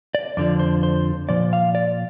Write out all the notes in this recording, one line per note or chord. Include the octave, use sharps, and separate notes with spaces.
D5
F2 D3 F3 D5
C5
C5
A#2 F3 D5
F5
D5